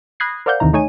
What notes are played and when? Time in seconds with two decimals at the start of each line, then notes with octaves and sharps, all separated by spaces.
0.20 B5 D#6 F#6 G#6 A#6 C7
0.46 A#4 C5 D5 F5 F#5 G6
0.60 D#2 C3 D#3 E3 A#5
0.73 A3 D#4 C#5 G#5 D#7